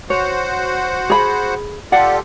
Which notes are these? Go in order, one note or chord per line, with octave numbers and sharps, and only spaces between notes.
F#4 C5 C#5 F#5
G#4 B5
F4 G4 A4 D5 F#5